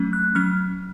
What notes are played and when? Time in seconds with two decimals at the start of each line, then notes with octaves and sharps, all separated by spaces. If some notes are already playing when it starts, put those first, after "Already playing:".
Already playing: F#3 A3 C#4
0.13 F#6
0.35 F#3 C#4 F6